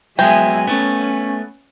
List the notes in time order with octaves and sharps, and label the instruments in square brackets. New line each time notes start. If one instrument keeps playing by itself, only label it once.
[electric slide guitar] F#3 G#3 B3 [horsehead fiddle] E5 G#5 [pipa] G5
[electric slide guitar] A3 B3 [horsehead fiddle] C#4